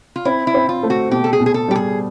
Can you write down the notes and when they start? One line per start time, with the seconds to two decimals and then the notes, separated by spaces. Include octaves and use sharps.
0.16 F4
0.25 C4 E4
0.47 E4
0.54 C4
0.69 F4
0.83 A3
0.90 F#4
1.11 B2 G4
1.24 A4
1.33 G#4
1.40 B2
1.46 G#4
1.54 A4
1.68 G3 G4
1.75 G#4